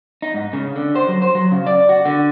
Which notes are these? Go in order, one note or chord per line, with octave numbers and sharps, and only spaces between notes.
D#4
G#2
C#3
D3
C5
F#3
C5
F#3
C#3
D5
F#4
D3